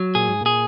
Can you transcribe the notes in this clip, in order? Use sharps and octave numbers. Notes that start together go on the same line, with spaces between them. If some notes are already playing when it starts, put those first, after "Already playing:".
Already playing: F#3
A#2 G#4
G#2
A#2 G#4